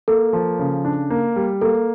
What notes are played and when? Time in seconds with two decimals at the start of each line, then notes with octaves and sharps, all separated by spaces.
0.08 A#3 A4
0.33 F3
0.59 C#3
0.85 D4
1.10 A#3
1.36 G3
1.61 A#3 A4